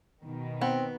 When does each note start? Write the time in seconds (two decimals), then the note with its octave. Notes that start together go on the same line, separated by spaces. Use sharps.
0.24 B2 D#3
0.61 B3 C4